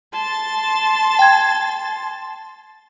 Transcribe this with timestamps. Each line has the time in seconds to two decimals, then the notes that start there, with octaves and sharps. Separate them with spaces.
0.12 A5 C6 A6
1.19 G5 G#6